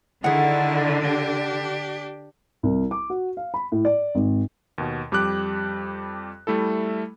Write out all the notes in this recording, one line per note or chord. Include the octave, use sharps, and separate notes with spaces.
D3 D#3 E4 G#4 F#5
D4 G4
C2
D6
F#4
F5
B5
A2
D5
G#1
D#2 B2
F2 G3 G4 D6 F#6
G3 A3 E4 A4